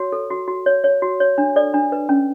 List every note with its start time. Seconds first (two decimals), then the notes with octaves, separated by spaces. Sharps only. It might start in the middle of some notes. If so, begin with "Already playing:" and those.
Already playing: F#4 C#5
0.12 A4
0.31 F#4
0.48 F#4
0.66 C#5
0.84 C#5
1.02 F#4
1.20 C#5
1.38 D4
1.56 A4 D5
1.74 D4
1.92 B4
2.09 C#4